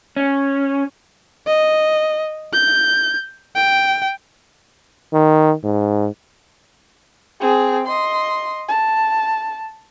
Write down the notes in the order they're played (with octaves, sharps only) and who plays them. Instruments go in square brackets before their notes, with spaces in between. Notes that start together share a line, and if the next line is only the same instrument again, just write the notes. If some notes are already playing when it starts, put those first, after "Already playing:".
[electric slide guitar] C#4
[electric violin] D#5
G6
G5
[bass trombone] D#3
G#2
[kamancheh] C4 G#4
D#5 C6
A5